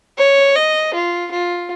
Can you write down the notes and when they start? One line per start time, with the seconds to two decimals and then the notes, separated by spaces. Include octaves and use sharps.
0.18 C#5
0.56 D#5
0.94 F4
1.31 F4